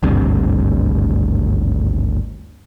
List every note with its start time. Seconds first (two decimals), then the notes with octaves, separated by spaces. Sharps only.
0.03 G#1 D2 G2 C3